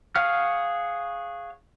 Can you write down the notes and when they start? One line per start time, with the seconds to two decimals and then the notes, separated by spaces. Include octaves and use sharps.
0.16 G#4 C#5 F5 F#5 F6